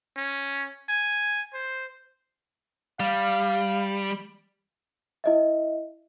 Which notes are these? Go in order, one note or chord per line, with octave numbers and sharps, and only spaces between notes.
C#4
G#5
C5
G3 F5
E4 D#5 E5